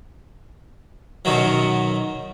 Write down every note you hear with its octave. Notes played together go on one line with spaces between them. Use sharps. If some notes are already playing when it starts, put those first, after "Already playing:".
F#2 B2 D#3 F#3